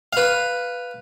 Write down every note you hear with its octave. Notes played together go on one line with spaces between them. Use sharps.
B4 F5